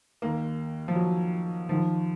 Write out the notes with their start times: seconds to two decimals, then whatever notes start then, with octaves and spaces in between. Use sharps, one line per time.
0.22 D#2 D#3 A#3
0.88 F3
0.95 F#3
1.69 D#2 D#3 F3